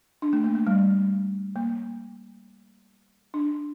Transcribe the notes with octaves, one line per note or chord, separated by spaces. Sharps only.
D4
A3
A#3
A3
G3
A#3
D4